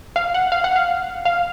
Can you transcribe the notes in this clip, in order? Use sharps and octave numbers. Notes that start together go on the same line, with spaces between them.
F5
F#5
F5
F#5
F5
F5